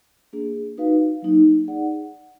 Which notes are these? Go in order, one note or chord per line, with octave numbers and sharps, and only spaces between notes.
A#3 D4 G#4
D#4 F#4 B4 F5
F#3 A#3 D#4
D#4 G#4 D5 F#5